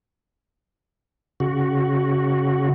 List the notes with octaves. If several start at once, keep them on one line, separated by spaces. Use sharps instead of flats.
C#3 F#4